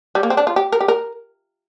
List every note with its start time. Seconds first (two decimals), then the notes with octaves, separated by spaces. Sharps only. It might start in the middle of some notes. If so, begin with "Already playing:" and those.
0.15 G3
0.23 A#3
0.30 C4
0.37 D4
0.47 F4
0.56 G4
0.72 A#4
0.81 G4
0.88 A#4